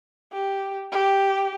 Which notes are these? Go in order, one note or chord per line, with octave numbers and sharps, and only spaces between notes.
G4
G4